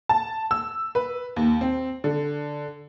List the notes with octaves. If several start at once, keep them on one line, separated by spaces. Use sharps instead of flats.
A5
E6
B4
D#2
C4
D3